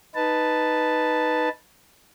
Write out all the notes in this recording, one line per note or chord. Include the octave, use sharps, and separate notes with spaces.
D#4 B4 A5